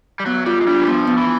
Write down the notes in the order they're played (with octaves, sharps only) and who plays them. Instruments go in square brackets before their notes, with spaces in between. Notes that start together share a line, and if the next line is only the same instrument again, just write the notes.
[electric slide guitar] G3
[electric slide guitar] F#3 [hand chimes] B3
[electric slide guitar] G3 [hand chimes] F4
[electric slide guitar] G#3
[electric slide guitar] G3 [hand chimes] D4
[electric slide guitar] E3
[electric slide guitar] F3 [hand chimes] B3
[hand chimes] B3
[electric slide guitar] E3